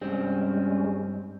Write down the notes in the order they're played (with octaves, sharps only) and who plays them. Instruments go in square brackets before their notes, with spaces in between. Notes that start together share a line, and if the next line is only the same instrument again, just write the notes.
[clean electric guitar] G2 C4 [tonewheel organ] G3 G#3 C#4